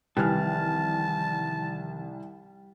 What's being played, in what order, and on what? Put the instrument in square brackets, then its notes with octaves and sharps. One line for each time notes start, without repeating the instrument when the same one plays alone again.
[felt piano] C2 G#5 F6 [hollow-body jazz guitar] F2 D#3 E3 [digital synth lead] G3 [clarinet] A5